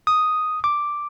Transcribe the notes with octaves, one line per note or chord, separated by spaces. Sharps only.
D#6
D6